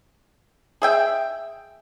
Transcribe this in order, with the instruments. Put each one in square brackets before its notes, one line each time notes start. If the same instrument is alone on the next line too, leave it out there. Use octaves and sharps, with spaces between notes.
[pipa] G#4 E5 G5